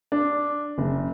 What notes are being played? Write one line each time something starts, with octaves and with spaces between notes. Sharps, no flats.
D4
F#1